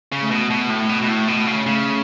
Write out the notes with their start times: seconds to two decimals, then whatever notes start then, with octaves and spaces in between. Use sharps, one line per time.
0.12 C#3
0.22 A3
0.31 B2
0.50 B2 A3
0.70 A2
0.89 B2
1.02 B2
1.08 A2
1.28 B2
1.47 C#3
1.66 C#3 A3